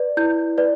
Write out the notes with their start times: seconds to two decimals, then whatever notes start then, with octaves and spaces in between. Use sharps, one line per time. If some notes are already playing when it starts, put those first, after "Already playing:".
Already playing: B4 D5
0.17 E4 G6
0.58 B4 D5